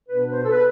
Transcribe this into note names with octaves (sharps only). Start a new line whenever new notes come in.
B2 B3 D4 B4
C5
A4
B4